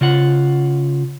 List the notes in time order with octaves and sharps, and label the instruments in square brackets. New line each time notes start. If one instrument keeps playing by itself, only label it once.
[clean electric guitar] C#3 F4 F#5